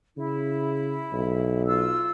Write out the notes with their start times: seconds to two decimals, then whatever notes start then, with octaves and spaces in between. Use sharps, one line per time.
0.17 C#3 E4
1.13 B1
1.67 F4 E6